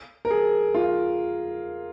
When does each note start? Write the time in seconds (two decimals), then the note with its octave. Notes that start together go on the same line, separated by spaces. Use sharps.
0.25 A#4
0.31 G#4
0.75 F4